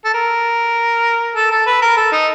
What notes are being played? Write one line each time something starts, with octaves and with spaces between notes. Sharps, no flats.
A4
A#4
A4
A4
B4
A#4
A4
D#4